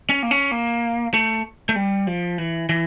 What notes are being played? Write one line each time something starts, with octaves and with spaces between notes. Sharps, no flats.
C#4
A#3
C#4
A#3
A3
A3
G3
F3
E3
E3